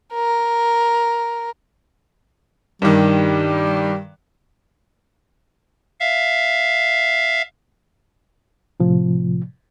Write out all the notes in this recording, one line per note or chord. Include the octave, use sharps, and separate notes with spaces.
A#4
G2 D#3 G3
E5 F5
A2 C3 F3